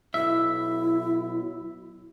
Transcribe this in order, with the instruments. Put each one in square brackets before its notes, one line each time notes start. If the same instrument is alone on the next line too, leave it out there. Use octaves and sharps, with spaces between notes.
[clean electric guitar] B1 E5 [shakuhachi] E4